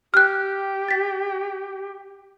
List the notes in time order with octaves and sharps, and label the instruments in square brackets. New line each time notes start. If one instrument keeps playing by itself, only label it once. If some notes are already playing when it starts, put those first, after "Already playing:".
[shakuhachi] G4 [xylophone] F6 F#6
[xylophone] A6 B6